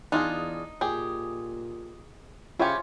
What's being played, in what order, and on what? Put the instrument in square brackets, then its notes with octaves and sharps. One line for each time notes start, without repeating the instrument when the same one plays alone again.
[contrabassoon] E2 [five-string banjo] D4 F4 G#4 [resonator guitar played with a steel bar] D#4
[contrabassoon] A#2 [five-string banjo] G4 G#4
[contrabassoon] C#3 [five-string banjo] E4 G4 [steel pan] F4 C#5 G#5